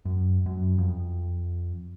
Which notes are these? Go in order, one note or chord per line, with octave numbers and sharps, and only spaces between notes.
F#2
F#2
F2